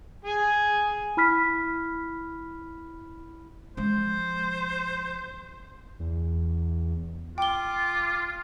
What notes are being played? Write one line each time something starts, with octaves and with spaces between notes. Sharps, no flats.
G#4 G#5
E4 B5 F6 B6
F3 G#3 C5
E2
F4 G5 D6 G7